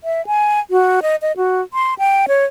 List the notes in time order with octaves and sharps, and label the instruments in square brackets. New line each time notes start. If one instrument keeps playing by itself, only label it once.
[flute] E5
G#5
F#4
D#5
D#5
F#4
C6
G5
C#5